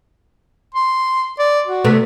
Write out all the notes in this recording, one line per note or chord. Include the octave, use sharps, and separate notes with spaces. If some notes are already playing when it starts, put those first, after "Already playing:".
C6
D5
F#4
C3 A3 B3